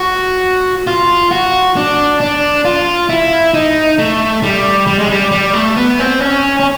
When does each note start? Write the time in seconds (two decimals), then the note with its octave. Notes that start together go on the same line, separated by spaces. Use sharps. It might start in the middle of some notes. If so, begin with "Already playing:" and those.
Already playing: F#4
0.87 F4
1.31 F#4
1.76 D4
2.20 D4
2.65 F4
3.09 E4
3.54 D#4
3.98 A3
4.43 G3
4.87 G3
4.99 G#3
5.10 G3
5.31 G3
5.54 A3
5.76 B3
5.99 C4
6.20 C#4
6.60 C#4